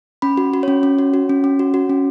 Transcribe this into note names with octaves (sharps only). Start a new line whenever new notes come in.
C#4 B5
F#4
F#4
C#4 C#5
C#4
F#4
F#4
C#4
C#4
F#4
F#4
C#4